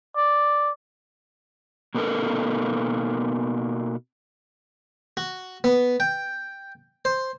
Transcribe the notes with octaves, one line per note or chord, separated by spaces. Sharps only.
D5
B2 A#3 B3 D#4 A4 A#4
F#4
B3
G5
C5